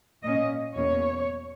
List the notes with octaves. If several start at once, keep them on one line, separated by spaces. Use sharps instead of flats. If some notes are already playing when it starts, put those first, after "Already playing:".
A#2 A#3 C#4 D#5
E2 B2 A#3 C#4 C#5